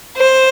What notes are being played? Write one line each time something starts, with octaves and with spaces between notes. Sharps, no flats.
C5